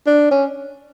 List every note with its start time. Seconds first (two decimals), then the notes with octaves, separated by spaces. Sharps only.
0.06 D4
0.31 C#4